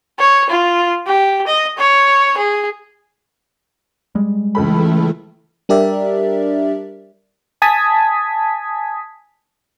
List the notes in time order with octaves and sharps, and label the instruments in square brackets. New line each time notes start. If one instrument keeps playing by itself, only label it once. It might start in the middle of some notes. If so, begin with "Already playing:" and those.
[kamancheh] C#5
F4
G4
D#5
C#5
G#4
[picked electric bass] G3 G#3
[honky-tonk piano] C#2 A4 B5 [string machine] E3 A3
[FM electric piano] G3 D4 G4 A#4 D5 E5
G#5 A5 D#6 G#6 B6